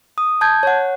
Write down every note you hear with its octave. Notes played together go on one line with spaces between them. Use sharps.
D#6
A5 G6 G#6
C#5 F#5